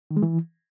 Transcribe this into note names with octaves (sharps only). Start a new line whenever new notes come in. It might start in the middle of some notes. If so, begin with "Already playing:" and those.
D#3
G#3
E3